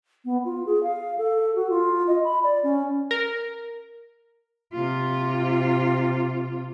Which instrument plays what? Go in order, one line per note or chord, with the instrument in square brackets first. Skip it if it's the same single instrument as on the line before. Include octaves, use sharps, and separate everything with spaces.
[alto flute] B3
F4
G#4
F5
A4
F#4
F4
D#5
B5
D5
C#4
[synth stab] A#4
[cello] C3 F4